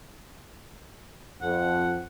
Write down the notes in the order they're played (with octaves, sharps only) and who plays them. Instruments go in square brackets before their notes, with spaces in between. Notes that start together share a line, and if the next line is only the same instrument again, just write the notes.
[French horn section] F2 [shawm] F#5